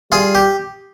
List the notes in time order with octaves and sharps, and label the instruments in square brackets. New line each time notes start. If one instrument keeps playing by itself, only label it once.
[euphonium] G3 [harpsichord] F4 G#4
[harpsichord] G4